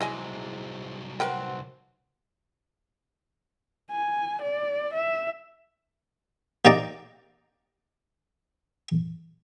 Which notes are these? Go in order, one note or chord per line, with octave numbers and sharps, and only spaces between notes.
C2 E3 F#3 G#3 C4 E4 D#5 G#5
C4 F#4 A#4 B4 G5
G#5
D5
E5
C3 A#3 D#4 D5 A#5 D6